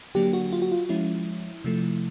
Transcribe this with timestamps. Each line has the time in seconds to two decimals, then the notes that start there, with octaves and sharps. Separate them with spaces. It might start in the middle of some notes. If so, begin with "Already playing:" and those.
0.15 D3 F#3 A#3 D4 G4
0.33 F#4
0.52 F4
0.62 F#4
0.71 F4
0.89 F3 G#3 C#4 E4
1.64 C3 F3 A3